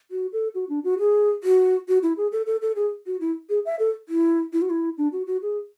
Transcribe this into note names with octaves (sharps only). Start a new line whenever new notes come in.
F#4
A4
F#4
D4
F#4
G#4
F#4
F#4
E4
G#4
A4
A4
A4
G#4
F#4
E4
G#4
E5
A4
E4
E4
F#4
E4
D4
F#4
F#4
G#4